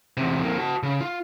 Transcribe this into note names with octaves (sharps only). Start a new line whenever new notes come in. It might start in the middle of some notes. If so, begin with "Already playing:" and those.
E2 C3
F2 A#3
F#4 A5
C#3
F4